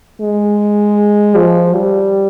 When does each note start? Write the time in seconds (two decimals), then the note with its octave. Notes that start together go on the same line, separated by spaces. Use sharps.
0.21 G#3
1.36 F3
1.75 G3